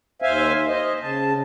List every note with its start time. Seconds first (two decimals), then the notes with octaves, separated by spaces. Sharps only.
0.22 D#2 C5 E5 F5 G#5
0.68 C5 D#5
1.03 C#3 A5